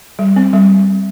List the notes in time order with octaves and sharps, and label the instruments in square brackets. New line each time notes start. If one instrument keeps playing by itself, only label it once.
[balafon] G3
C4
G3